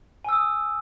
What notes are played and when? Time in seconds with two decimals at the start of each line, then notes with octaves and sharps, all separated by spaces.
0.25 G#5
0.29 E6
0.33 D#6